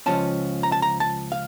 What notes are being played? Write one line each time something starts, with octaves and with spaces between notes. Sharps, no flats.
C#2 C#3 F3 C#4 A5
A#5
A5
A#5
A5
F5